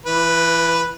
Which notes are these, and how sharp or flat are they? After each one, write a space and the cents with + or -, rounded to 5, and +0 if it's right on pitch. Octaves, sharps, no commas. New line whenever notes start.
E3 +30 B4 +0